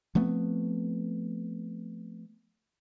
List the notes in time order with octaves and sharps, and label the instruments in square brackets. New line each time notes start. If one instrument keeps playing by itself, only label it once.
[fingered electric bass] F3 A3 B3 C4